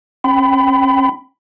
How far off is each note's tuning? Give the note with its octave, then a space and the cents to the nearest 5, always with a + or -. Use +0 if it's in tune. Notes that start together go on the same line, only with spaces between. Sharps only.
C#4 -35 G5 -10 B5 +30